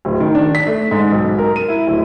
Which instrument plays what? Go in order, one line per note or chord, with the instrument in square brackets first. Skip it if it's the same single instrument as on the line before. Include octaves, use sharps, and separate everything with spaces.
[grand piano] D1
D#3
D4
B6
A3
G#2
B1
G#2
A#4
D#7
E4
D1